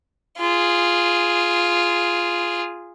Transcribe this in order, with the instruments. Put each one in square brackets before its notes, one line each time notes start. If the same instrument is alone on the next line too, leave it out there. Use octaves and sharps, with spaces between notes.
[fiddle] F4 G#4